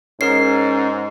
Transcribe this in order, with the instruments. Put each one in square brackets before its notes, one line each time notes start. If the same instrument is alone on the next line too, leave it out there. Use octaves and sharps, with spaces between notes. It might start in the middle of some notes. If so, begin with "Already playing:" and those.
[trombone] G#2 [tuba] C#4 [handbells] G#4 A#4 C#5 [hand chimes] C7